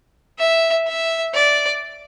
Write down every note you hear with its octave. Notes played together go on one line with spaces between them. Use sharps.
E5
E5
D5